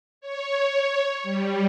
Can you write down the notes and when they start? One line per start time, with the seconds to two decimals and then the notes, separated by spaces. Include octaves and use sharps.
0.21 C#5
1.23 G3